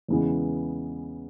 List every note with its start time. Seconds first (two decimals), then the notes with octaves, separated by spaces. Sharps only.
0.08 E2 C#3 E3 G#3 B3